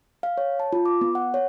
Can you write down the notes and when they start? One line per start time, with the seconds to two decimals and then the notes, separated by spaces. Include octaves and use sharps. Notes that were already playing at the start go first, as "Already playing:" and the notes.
0.23 F5
0.38 C#5
0.60 A5
0.73 F4
0.85 D6
1.01 B3
1.15 F#5
1.34 C#5